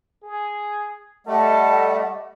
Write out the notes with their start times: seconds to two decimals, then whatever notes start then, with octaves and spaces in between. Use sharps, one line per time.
0.23 G#4
1.27 G3 A3 A4 D#5 F#5